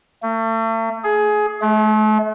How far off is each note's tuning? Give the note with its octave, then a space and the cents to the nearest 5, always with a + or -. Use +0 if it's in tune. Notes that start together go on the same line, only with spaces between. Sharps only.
A3 +40
G#4 +20
A3 -40